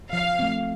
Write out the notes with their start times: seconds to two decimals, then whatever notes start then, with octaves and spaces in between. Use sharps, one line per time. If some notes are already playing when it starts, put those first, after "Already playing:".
0.12 F3 F5
0.39 A3 C4